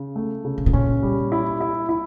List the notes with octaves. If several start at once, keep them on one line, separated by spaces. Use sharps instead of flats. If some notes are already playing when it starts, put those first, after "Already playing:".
Already playing: C#3
A3
C#3
C3
B2
A#2 C#4
G3
E4
E4
E4